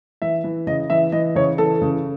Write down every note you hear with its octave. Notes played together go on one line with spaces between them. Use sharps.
E3 E5
E3
C#3 D#5
E3 E5
E3 D#5
C#3 C#5
E3 A4
C#3